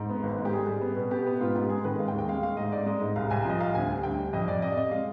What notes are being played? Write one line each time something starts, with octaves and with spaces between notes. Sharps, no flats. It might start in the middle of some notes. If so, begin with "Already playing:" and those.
Already playing: G#2
B3
G#1
G#2
G4
G3 G#4
G3
B3
B2
B3 G4
B3
G#2 F4
G#2 G4
G#3 G#4
D#3 B4
G#3 F5
G5
D#2
G5
G#3 F5
G#3 F5
G#2 D#5
G#2 D5
G#3 D#5
G#2
C2 F5
C2 G#5
F3 D#5
C2 F5
D2 G#5
G3
D2 G5
G3
F2 D#5
F2 D5
C3 D#5
D5
C3 D#5
G#3 F5